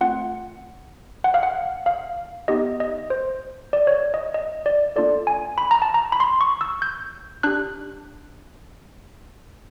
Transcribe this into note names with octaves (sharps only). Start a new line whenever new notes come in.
A3 C4 F4 F#5
F#5
F5
F#5
F5
B3 D#4 G4 D#5
D#5
C5
D5
C#5
D5
D#5
D#5
D5
A#3 D4 F4 A4 D5
G#5
B5
A#5
A5
A#5
B5
C6
C#6
E6
G6
D4 G4 F#6